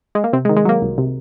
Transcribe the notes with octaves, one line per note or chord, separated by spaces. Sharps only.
G#3
A#3
C3 C4
G#3
D#3
G#3
F#3 A#3
C2
C3